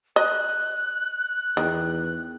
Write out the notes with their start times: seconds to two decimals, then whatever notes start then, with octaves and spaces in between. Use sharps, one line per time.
0.16 D#5 F#6
1.57 E2 D#3